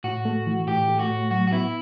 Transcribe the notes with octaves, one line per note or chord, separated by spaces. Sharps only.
A2 F#4
A3
E3
A2 G4
A3
F#4
A2
F#3 F#4
F#4
B3 E4